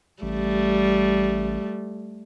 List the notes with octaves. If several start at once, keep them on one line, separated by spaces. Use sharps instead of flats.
A1 G3 A3